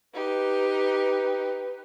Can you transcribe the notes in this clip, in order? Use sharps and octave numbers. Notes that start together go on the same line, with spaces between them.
D#4 G4 B4